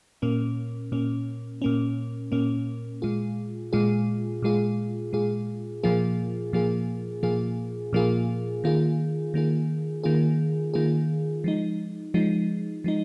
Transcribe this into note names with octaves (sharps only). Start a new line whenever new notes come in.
A#2 A#3 C#4
A#2 A#3 C#4
A#2 A#3 C#4
A#2 A#3 C#4
A#2 G#3 F4 G#4
A#2 G#3 F4 G#4
A#2 G#3 F4 G#4
A#2 G#3 F4 G#4
A#2 F3 A#3 F4 G#4
A#2 F3 A#3 F4 G#4
A#2 F3 A#3 F4 G#4
A#2 F3 A#3 F4 G#4
D#3 A#3 F4 G#4
D#3 A#3 F4 G#4
D#3 A#3 F4 G#4
D#3 A#3 F4 G#4
F3 G#3 D#4
F3 G#3 D#4
F3 G#3 D#4